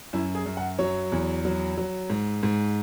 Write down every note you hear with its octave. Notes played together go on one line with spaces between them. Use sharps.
F#2 E4
G#4
F#2
F#5
F#3 C#5
E2
F#3
F#3
G#2
G#2